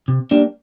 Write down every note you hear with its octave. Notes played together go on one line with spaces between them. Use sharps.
C3
G3 A#3 D4